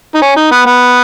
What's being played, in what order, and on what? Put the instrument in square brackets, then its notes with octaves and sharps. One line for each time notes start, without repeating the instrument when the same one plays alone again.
[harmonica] D#4
C#4
D#4
B3
B3